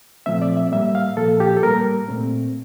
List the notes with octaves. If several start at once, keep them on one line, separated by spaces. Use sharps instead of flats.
A#2 F3 A3 C4 E5
D5
E5
A2 G3 A#3 E5
F5
A#2 F3 A#3 A4
G4
A4
A2 G3 A#3 A#4
A#2 A3 C4